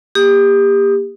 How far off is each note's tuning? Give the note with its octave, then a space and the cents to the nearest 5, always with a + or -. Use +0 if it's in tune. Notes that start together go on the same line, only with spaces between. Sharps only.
A#3 +20 G4 +25 D#6 +0